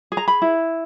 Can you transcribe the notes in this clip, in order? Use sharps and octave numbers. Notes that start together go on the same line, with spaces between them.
G#4
A#5
B5
E4